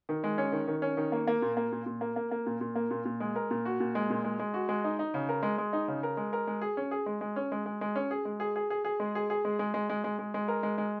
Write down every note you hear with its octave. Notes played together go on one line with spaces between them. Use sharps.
D#3
G#3
C#4
D#3
D#3
C#4
D#3
A#3
A#3
A#2
A#3
A#2
A#2
A#3
A#3
A#3
A#2
A#2
A#3
A#2
A#2
G#3
A#4
A#2
F#4
A#2
G#3
A#2
G#3
G#3
F#4
G#3
D#4
D#4
C#3
A#4
G#3
G#3
D#4
C#3
A#4
G#3
A#4
G#3
G#4
C#4
G#4
G#3
G#3
C#4
G#3
G#3
G#3
C#4
G#4
G#3
G#4
G#4
G#4
G#4
G#3
G#4
G#4
G#3
G#3
G#3
G#3
G#3
G#3
G#3
A#4
G#3
G#3